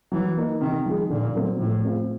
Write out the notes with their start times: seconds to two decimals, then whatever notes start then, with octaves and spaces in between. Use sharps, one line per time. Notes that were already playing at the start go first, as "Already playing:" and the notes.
0.12 E3 F#3
0.37 A#3 D#4
0.61 C3 D#3
0.86 F3 G#3
1.10 A#2 D3
1.35 F#3 A3 C4
1.59 A2 F3
1.83 G#3 C4 F4